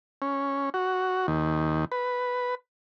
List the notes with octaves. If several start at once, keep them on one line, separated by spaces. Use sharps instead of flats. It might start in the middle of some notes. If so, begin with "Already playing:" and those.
C#4
F#4
D#2
B4